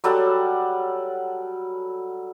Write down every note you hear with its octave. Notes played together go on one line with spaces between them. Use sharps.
F#3 G3 A4 F#5